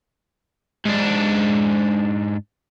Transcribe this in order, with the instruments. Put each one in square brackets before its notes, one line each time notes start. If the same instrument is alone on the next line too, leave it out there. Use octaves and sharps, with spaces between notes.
[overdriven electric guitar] G#2 D4